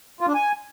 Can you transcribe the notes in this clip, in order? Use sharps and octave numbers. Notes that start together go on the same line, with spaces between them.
F4
D4
G#5